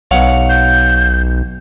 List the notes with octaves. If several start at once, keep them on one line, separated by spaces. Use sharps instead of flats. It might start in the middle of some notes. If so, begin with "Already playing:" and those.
B1 C#5 F5 F#5
G6